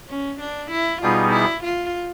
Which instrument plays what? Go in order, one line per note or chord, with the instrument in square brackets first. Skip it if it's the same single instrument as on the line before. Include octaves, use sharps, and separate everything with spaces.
[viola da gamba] C#4
D4
E4
[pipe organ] B2 G3 B3 D#4 G#4 [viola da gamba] F4
[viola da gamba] E4
F4